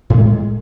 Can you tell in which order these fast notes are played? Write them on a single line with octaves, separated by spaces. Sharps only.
A2 A3 G#3